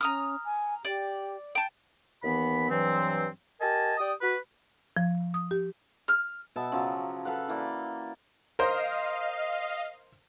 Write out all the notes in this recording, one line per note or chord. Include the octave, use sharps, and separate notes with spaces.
C#4 A#5 D#6 F6
G#5
G4 D5
G5 A5
D#2 E3 B3 B5
G2 E3 F#3 C4
G4 A#4 D#5 G#5 A5
G4 D5 G5 D#6
F#4 B4
F3
D#6
G4
F6
B2 B3 E5 A5
C#3 F3 F#3 A#5
A4 B4 F5 F#5
E3 A#3 D5
A#4 C5 D#5 F5 C7